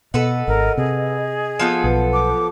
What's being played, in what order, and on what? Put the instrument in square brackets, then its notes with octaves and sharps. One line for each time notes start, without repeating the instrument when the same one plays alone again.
[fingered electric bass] B2 [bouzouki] A4 B4 F#5 [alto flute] D#5
[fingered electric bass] G#1 [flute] A#4
[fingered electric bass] C3 [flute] G#4
[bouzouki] F3 B3 A4
[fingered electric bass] B1 [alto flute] B4
[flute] D6